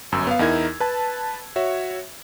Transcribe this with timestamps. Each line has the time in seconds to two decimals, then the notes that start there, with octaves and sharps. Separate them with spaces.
0.12 G1 F#2 E6
0.27 B3 F5
0.39 E2 D#4 E4 A#4 G#6
0.80 B4 A5
1.56 F#4 C#5 E5